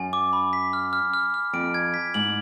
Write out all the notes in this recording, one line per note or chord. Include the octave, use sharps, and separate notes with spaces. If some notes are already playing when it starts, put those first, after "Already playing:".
Already playing: F#2 G#5
D6
B5
B6
F6
F6
F6
F6
F2 D7
G#6
B6
G#2 F#7